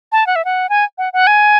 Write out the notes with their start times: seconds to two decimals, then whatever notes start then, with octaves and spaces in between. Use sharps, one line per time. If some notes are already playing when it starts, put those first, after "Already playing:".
0.12 A5
0.27 F#5
0.36 E5
0.45 F#5
0.69 G#5
0.98 F#5
1.13 F#5
1.27 G#5